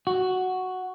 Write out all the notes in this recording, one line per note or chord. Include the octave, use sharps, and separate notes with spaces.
F#4